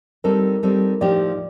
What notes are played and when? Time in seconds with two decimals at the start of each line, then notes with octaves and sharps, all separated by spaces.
0.24 G3 C4 D#4 A4 A#4
0.63 G3 C4 D#4 A4
1.01 A2 F3 A#3 D#4 G4 D5